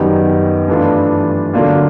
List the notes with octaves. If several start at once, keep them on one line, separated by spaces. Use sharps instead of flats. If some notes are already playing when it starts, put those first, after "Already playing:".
Already playing: F#2 D#3 G3 B3
G2 E3 A3 D4 F4
D3 F#3 A#3 D4 F4